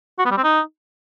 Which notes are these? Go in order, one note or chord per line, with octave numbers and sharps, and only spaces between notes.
F#4
B3
G3
C4
D#4